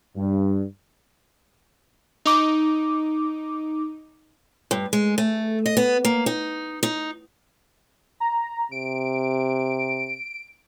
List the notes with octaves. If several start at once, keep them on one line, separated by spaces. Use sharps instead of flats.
G2
D#4 D6
G2
G#3
A3
D#5
B3
A#3
D#4
D#4
A#5
C3 D7